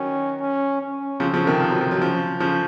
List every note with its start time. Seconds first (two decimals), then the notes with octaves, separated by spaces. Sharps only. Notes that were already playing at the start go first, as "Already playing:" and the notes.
Already playing: D#3 F#3 C#4
0.41 C#4
0.81 C#4
1.20 C#3 F3 C4
1.34 C#3 F3
1.47 C3 D#3
1.60 F3
1.71 F#3
1.81 F3
1.91 F#3
2.01 C#3 F3
2.40 C#3 F3